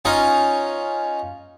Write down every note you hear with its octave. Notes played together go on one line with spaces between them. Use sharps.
C#4 D#4 F4 D#5